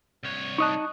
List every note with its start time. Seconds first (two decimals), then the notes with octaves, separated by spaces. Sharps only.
0.23 C2 C#5
0.58 D#4 D#5 A5 C#6 D#6 F#6